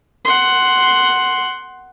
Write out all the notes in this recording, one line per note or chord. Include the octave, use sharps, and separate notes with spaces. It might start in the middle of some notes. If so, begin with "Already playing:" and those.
F#5 C6